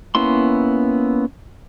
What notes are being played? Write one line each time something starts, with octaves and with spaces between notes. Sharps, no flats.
A#3 B3 C#4 E4 C6